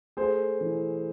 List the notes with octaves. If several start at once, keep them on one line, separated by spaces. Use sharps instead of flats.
A3 G#4 C5
E3